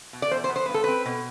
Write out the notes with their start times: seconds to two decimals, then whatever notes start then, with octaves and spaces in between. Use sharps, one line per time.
0.13 B2
0.22 D5
0.31 E2 C5
0.44 C5
0.49 B3
0.56 C5
0.66 G2 B4
0.74 A4
0.84 C4 B4
1.06 B2